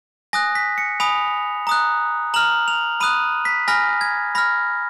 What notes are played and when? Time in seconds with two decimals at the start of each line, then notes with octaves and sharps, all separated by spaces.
0.33 G#5 D#6 F#6 A#6
0.55 B6
0.78 C#7
1.00 G#5 B5 D#6 F7
1.67 A#5 D#6 F#6
2.34 A#5 F6 F#7
2.68 F7
3.00 B5 D#6 F#6 D#7
3.45 B6
3.68 G#5 B5 F6 A#6
4.01 G#6
4.35 B5 F6 A#6